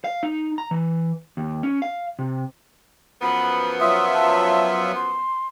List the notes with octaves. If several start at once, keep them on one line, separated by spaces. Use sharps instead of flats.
F5
D#4
A#5
E3
D#2
C#4
F5
C3
F#2 F3 B3 B5
F#3 F4 E5 D#6
A5
C6